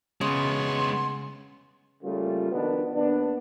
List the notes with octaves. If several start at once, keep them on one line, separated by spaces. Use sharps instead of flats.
C#3 G#3 B3 C#5 C6
C#3 G3 A3 A#3 F4
B2 D#3 F3 B3 D4 D#4
D#2 B3 D4